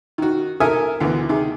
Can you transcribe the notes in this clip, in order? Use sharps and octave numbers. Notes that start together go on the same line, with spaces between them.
D#3 F#4
A4 A#4 E5 G#5 D#6 F6
D2 B2 D3 E3
C3 D#3 G#4